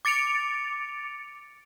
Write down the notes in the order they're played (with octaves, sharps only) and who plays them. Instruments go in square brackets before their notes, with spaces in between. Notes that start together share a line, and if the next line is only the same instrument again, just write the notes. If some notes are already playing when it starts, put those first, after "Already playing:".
[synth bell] D6 A6 C#7 D7 F7